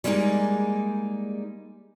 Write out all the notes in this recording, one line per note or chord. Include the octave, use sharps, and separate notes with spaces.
G3 G#3 A#3 B3 D#4 G#4